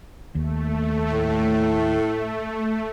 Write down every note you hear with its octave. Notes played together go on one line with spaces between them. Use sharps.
D#2 A3
A2